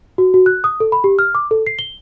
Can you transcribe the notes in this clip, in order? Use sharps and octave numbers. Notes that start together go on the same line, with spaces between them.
F#4
F#4
F#6
D#6
A4
B5
G4
F6
D6
A4
C7
G7